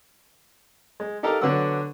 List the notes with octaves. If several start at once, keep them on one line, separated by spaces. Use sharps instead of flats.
G#3
D#4 G4 A4 A#4 F5 A#5
D3 F#3 B3 D4 F#5 E6